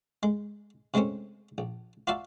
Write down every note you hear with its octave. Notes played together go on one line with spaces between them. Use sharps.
G#3
C3 G#3 A3 C4 C#4
A#1
F4 F#4 D5 E5 F5 A5